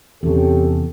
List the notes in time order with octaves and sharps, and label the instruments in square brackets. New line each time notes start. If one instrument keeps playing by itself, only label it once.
[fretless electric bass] E2 C3 [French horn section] C#4 G4 A4